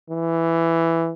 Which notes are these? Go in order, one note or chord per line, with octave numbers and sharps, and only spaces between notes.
E3